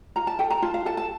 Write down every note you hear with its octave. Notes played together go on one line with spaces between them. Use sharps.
F4 A#5
A5
A4 G5
A#5
F4 A5
F5
A4 A5
A5